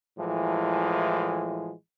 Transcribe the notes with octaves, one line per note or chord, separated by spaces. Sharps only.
A2 E3 F3 G#3